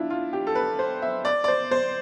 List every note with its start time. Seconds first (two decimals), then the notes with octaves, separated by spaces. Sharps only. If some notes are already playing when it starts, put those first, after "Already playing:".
Already playing: D4 E4 F4
0.10 F4
0.33 G4
0.47 A4
0.55 B4
0.79 C5
1.02 E5
1.25 D5
1.44 D5
1.48 C5
1.71 C5